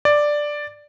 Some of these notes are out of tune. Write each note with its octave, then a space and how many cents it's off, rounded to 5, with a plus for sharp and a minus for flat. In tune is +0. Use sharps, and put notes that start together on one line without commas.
D5 +5